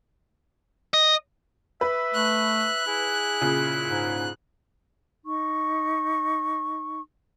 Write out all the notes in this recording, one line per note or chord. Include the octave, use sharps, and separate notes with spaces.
D#5
B4 E5
A3 F#6
E4 G#4
A#2 C#3
G#2
D#4 C#6